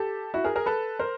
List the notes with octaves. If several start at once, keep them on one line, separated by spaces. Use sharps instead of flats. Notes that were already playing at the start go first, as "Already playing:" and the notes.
Already playing: G4 A4
E4 F#4
G#4 A#4
G#4 A#4
A4 B4
A#4 C5